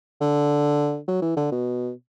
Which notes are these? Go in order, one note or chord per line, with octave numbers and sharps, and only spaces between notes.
D3
F#3
E3
D3
B2